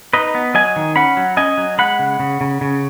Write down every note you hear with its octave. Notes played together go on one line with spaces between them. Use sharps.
D#4 B4 D#5
B3
F#3 D#5 G#5
D#3
C#4 F#5 B5
F#3
C#4 D#5 G#5
F#3
G#3 F#5 B5
C#3
C#3
C#3
C#3